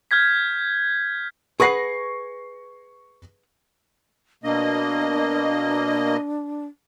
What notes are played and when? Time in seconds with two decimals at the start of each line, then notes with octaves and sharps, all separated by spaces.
0.11 F6 G6 G#6 B6
1.60 G#4 B4 F#5 C#6 A#6 C7
4.44 B2 A#3 D4 D#5